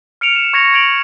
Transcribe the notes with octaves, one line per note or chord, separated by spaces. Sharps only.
F6 C#7 D7 F7
E7
C#6 G#6 A#6 C#7 F7
G#6 D7 F7 F#7